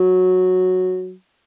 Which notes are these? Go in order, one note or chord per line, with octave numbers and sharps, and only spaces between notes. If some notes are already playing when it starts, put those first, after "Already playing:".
Already playing: F#3